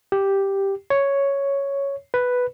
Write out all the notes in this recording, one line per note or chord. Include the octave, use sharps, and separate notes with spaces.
G4
C#5
B4